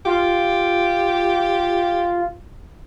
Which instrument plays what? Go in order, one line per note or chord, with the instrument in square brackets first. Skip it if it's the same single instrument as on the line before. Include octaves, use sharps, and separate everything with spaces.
[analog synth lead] F4 [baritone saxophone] G4